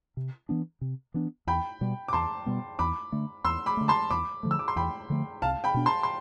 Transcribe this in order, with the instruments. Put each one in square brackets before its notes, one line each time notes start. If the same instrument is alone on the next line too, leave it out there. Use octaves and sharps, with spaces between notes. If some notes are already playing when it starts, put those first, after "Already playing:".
[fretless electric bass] C3
E3 B3 D4
C3
E3 B3 D4
[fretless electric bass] E2 [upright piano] G5 B5
[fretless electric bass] B2 G3 B3
[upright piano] D6
[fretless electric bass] E2 [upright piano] A5 C6
[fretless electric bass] B2 G3 B3
[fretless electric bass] E2 [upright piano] B5 D6
[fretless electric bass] D3 A3
[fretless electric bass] E2 [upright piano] C6 E6
[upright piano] B5 D6
[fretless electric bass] D3 A3
[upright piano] A5 C6
[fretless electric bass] E2 [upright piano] B5 D6
[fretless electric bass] D3 F3 A3
[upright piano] E6
D6
C6
[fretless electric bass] E2 [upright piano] G5 B5
[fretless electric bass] D3 F3 A3
[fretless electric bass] C2 [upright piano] F5 A5
[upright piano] G5 B5
[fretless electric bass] B2 B3 D4
[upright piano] A5 C6
C6